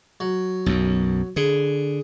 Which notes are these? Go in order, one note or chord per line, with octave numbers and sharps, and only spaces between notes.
F#3
B1 F#2
D3 G#4